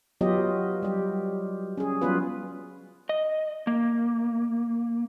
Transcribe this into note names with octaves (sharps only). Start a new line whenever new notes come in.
F#3 B3 F4 G4 D#5
G3 G4
C#4 G#4
F#3 G3 B3 C#4 F4 B4
D#5
A#3